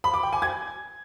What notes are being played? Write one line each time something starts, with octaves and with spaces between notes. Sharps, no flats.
B5
D6
G5
G#5
G#6